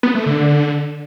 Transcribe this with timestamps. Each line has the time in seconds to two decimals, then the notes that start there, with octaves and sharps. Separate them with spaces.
0.03 B3
0.15 A3
0.26 D3